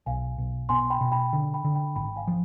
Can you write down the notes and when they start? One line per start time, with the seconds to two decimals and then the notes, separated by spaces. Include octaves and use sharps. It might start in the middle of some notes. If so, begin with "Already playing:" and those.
0.06 B1 F5 G#5
0.38 B1
0.69 B2 G#5 C6
0.90 G5 B5
1.01 B2
1.12 G5 B5
1.33 D3
1.54 G5 B5
1.65 D3
1.75 G5 B5
1.96 G#1 G5 B5
2.16 F5 G#5
2.27 F3